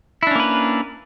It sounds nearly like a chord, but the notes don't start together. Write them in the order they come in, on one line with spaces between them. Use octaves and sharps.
E4 D4 C#4 A#3 B4